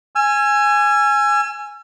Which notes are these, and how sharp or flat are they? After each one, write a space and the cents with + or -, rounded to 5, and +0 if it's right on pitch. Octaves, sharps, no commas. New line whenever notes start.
G#5 +0 E6 +40